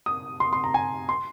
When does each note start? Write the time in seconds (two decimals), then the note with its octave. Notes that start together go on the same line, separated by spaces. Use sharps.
0.06 D#6
0.40 C6
0.53 C6
0.64 A#5
0.74 G#5
1.09 C6